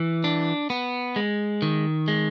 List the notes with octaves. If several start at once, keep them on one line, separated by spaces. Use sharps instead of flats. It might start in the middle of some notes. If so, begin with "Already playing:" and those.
Already playing: E3
D4
B3
G#3
D#3
G#3